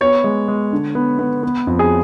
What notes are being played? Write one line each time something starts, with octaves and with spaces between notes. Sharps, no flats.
B3 C#5
G#3
G#3
D3
B3
B3
B3
F2
G#4